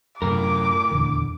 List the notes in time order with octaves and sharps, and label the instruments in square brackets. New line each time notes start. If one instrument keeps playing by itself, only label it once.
[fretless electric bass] F#2 C3 [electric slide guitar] A2 A#4 [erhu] D6
[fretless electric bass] D#1 E2 D3